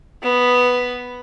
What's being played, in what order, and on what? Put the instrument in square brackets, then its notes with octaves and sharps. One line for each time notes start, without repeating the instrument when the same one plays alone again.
[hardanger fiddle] B3